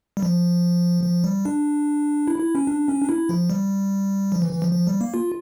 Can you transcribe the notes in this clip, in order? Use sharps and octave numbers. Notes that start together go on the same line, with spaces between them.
G3
F3
F3
G3
D4
E4
E4
C#4
D4
C#4
D4
E4
F3
G3
F3
E3
E3
F3
F3
G3
A#3
F4